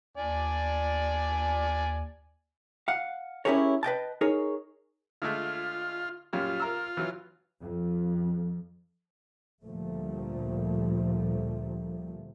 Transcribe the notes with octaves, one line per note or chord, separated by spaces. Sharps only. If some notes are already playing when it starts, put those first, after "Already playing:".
D#2 D4 D5 G#5
F5 F#5
C#4 E4 G4 G#4 A#4 C#5
B4 D#5 G5 A5
D#4 G#4 A#4 C#5
D3 G#3 A3 F4
F#2 A#2 G3 F4
A#4 A#5 E6
E3 F#3
F2
D2 A#2 F3 G3 A3